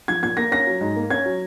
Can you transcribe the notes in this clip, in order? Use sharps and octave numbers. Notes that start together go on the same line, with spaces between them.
F3 G#6
A#2 G#6
A#3 A#6
C#4 A#6
F#3
G#2
A#3
C#4 G#6
F#3